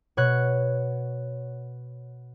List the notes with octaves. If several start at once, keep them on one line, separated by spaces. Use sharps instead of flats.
B2 C#5 F#6